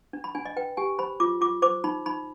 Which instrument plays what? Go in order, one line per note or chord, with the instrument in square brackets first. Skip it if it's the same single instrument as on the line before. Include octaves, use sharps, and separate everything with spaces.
[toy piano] D4
B5
D4 G#5
D#5
B4 G5
G4 G#5
C5 B5
F4 D6
F4 D6
C5 D6
D#4 B5
D#4 B5